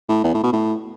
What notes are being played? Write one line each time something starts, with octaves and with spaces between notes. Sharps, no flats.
A2
E2
A2
B2
A2